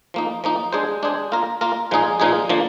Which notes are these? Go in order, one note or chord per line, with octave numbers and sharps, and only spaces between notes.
F3 A#3 D#4
F3 A#3 D#4
G#3 D4 G#4 C5
G#3 D4 G#4 C5
A#3 F4 A#4
A#3 F4 A#4
A#2 F3 G#3 D#4 G#4
A#2 F3 G#3 D#4 G#4
D3 F3 A#3